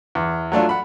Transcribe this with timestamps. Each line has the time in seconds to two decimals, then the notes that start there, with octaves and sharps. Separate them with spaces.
0.15 E2
0.52 F#3 A3 D4 F4
0.69 F#5 B5